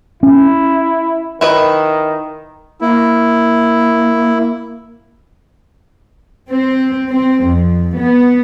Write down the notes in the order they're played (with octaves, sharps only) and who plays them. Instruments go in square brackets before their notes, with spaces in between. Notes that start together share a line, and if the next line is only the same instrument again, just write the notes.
[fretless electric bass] C#4 [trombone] E4
[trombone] D#3 [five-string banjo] E4 B4 D#5
[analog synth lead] A#3 [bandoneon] E4
[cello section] C4
C4
F2
B3